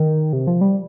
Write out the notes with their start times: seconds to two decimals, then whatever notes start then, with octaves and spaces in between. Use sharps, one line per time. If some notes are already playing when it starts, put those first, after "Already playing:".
Already playing: D#3
0.33 C3
0.47 F3
0.61 G3